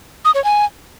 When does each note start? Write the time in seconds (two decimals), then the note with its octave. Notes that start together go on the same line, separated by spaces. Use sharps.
0.25 D#6
0.35 C#5
0.44 G#5